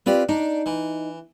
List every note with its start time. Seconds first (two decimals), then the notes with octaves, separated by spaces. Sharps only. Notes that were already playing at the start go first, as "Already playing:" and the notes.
0.06 C4 F4 G4 B4 D5
0.29 D4 D#4
0.66 E3